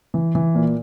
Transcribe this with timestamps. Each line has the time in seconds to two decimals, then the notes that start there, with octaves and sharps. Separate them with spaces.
0.14 E3
0.35 E3
0.55 A#2